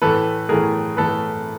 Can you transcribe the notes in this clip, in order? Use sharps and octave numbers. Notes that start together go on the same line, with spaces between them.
A2 E3 A3 A4 B4
A2 E3 A3 G#4 A#4
A2 E3 A3 A4 B4